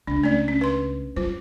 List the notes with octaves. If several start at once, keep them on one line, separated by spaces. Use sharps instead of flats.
C#2 D4
A3 C#4 D5
C#4
B4 C6
F#3 F4 C5